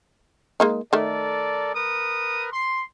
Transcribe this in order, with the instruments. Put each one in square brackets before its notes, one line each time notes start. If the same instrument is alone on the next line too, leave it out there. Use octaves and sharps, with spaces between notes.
[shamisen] G#3 A#3 D#4
[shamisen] D#3 A3 [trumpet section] A4 A#4 D5
[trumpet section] A#4 B4 D#6
C6